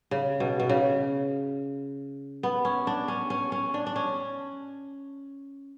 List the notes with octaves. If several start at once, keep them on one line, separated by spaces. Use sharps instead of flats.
C#3
B2
B2
C#3
B3
C#4
D4
C#4
C#4
C#4
D4
D4
C#4